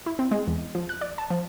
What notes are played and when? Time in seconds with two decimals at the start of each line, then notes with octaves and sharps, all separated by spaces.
0.06 E4
0.19 C4
0.31 G#3
0.48 E2
0.75 F3
0.89 F#6
1.01 D5
1.18 A5
1.30 F3